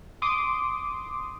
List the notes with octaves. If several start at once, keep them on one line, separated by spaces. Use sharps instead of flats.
C6 D6 D#6